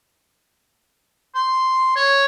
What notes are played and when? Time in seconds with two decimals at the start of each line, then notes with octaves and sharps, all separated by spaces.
1.35 C6
1.96 C#5